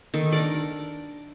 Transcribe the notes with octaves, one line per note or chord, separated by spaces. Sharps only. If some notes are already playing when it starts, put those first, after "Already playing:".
D#3 A4
D4 A#4 D5